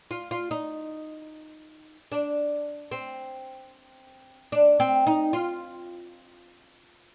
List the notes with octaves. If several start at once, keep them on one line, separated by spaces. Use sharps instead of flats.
F4
F4
D#4
D4
C4
D4
C4
D#4
F4